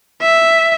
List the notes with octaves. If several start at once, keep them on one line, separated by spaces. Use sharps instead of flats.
E5